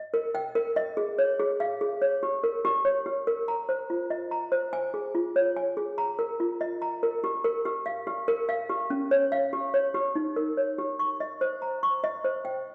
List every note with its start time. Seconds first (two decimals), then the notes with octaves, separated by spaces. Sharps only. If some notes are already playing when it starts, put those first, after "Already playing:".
Already playing: D#5
0.14 A#4
0.35 G5
0.55 A#4
0.76 D#5
0.97 G#4
1.18 C#5
1.40 G#4
1.60 F5
1.81 G#4
2.02 C#5
2.23 G4
2.44 A#4
2.65 G4
2.85 C#5
3.06 G4
3.27 A#4
3.48 A#5
3.69 C5
3.90 F4
4.10 D#5
4.31 A#5
4.52 C5
4.73 G#5
4.94 G#4
5.15 F4
5.36 C#5
5.56 G#5
5.77 G#4
5.98 A#5
6.19 A#4
6.40 F4
6.61 D#5
6.82 A#5
7.03 A#4
7.24 G4
7.44 A#4
7.65 G4
7.86 F5
8.07 G4
8.28 A#4
8.49 F5
8.69 G4
8.90 C#4
9.11 C#5
9.32 F5
9.53 G4
9.74 C#5
9.94 G4
10.15 D#4
10.36 A#4
10.57 C#5
10.78 G4
10.99 C#6
11.20 D#5
11.41 C5
11.62 A#5
11.83 C#6
12.04 D#5
12.24 C5
12.45 G5